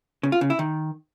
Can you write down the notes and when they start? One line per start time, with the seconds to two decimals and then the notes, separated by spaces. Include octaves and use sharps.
0.23 C#3
0.32 F4
0.41 C#3
0.50 E4
0.59 D#3